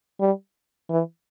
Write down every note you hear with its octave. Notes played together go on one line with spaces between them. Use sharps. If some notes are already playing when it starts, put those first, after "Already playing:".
G3
E3